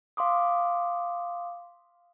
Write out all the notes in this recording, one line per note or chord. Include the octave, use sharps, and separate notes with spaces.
F5 C6 D6 D#6